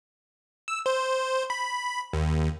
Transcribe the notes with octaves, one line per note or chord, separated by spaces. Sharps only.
E6
C5
B5
D#2